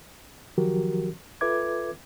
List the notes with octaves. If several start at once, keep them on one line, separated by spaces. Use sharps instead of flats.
D#3 F3 F#3 F#4 G4 A#4
F4 A4 B4 E5 D6 G#6